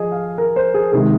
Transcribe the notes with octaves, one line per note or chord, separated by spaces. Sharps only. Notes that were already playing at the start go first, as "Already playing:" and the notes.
Already playing: F3 G#4 D#5
F5
A#4
C5
G#4
C3 D#3 G#3 G#4